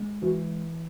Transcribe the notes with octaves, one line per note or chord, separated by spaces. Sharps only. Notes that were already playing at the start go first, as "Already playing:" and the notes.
Already playing: G#3
E3 F#4